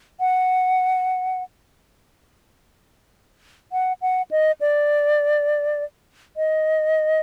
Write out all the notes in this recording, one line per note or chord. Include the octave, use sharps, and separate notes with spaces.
F#5
F#5
F#5
D#5
D5
D#5